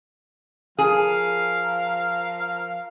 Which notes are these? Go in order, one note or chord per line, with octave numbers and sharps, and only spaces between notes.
F3 G#4 A#4 F5